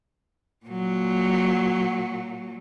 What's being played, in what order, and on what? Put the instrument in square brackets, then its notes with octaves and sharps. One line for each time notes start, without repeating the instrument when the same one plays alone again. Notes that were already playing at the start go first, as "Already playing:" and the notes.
[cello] A#2 F#3